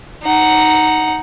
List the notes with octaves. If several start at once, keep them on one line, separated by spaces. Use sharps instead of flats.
D#4 F#5